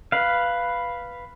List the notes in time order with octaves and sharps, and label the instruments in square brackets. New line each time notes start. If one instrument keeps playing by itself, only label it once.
[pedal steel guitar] B4 F5